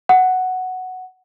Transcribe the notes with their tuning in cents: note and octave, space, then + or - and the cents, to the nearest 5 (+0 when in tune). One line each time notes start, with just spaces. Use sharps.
F#5 +0